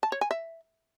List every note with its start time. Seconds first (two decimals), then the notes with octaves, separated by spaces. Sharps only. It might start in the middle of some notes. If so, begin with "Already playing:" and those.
0.03 A5
0.12 C#5
0.21 G#5
0.31 E5